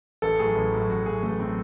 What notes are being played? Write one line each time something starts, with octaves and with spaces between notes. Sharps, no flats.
A1 A4
A2 F#3 G#4
A1
A2 F#3
A1 F#4
A2 F#3 G#4
A1 A3
A2 F#3 C4